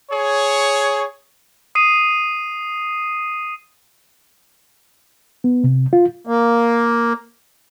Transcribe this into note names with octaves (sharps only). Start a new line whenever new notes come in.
G#4 C#5
D#6 C7 D#7
B3
C3
F4
A#3